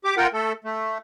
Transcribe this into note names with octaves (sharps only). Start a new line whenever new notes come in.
G4 D6
F4 A#4 F#5 G5
A3 A4
A3